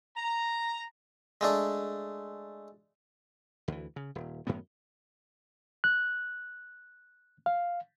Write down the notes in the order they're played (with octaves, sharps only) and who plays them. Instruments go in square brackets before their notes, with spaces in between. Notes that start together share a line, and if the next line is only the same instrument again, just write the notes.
[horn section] A#5
[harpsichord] G#3 A3 D4
[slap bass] D2 E3
C#3
D#1
F#2 A2 D#3 B3
[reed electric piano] F#6
F5